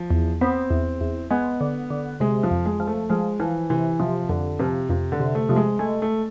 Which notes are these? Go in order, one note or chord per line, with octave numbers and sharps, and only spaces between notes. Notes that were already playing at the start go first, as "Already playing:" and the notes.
Already playing: F3
E2
B3 C4
E2
E2
G#3 B3
D3
D3
C3 G#3
F3
F2
G#3
F3
A3
F3 G#3
E3 F3
C3 E3
C3 F3
F2 D3
C3 F3
F2 C3
D3
C3
A3
C3 F3
G#3
G#3 A3
A3